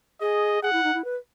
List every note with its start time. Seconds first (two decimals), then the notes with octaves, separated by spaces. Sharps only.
0.21 G#4 D#5
0.62 G#4 F#5
0.73 E4
0.84 D#4
0.94 E4
1.04 B4